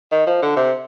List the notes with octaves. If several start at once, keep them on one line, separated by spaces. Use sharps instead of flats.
D#3
F3
D3
C3